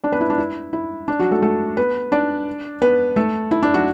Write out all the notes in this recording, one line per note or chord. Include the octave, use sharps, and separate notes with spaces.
D4 D5
B3 B4
E4
D4
E4
E4
D4
F#3 F#4
A3 A4
A3 A4
B3 B4
D4 D5
B3 B4
A3 A4
E4
D4
F#3 F#4